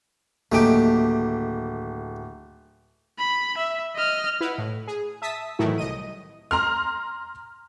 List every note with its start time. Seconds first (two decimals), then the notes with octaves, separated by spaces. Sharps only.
0.52 D1 D#3 A3 A#3 D#4 G4 D7
3.19 B5
3.58 E5
3.96 D#5 F6
4.41 E4 B4 F#5
4.58 A2
4.87 G#4
5.22 E5 A5 D#6 E6 B6
5.59 A2 D#3 E3 F#3 A3 E4
5.78 C2 D#5 D#7
6.51 A#5 C6 F6